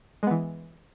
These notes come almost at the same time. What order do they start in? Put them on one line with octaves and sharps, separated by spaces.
G#3 B3 E3